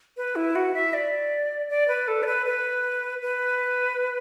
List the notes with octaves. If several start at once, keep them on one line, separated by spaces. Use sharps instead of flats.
B4
E4
F#4
E5
D5
D5
B4
A4
D5
B4
B4
B4